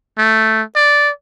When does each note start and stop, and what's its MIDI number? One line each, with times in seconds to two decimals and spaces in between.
0.18 0.62 57
0.76 1.10 74